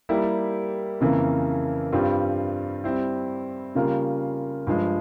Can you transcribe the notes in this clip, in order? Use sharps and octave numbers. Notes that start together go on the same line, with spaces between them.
G3 A#3 E4 G4
F2 C#3 E3 A#3
G2 G3 C4 F4
G3 C4 E4
C#3 G3 A#3 F4 A#4
G2 F3 G#3